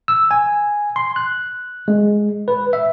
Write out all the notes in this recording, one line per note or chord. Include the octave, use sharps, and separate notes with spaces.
E6
G#5
C6
F#6
G#3
B4
E5